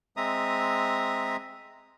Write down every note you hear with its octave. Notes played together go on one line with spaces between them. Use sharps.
G#3 C4 E5 A#5 D#6